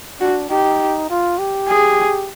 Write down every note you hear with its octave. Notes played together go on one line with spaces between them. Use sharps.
D4 F#4
D#4 G4
F4
G4
G#4